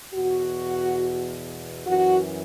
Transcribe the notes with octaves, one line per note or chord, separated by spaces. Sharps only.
E2 B2 F#4
F#2 E3 F#4